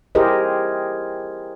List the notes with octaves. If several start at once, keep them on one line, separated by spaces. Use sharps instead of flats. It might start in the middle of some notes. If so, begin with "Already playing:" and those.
E4 G4 G#4 A#4 C5 D#5